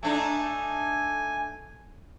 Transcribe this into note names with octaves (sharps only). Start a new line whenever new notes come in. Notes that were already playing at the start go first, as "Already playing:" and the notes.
A3 D4 D#4 G#5